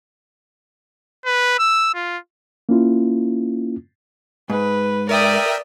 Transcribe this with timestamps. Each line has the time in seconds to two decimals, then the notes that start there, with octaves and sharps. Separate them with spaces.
1.25 B4
1.59 E6
1.95 F4
2.69 A#3 C#4 E4 F4
4.50 G#2 B4
5.09 A#4 D5 E5 G5 D#6